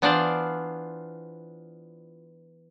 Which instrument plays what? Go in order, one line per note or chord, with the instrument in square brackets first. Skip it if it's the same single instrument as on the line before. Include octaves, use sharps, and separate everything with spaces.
[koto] E3 B3 D4 F4 C5 D5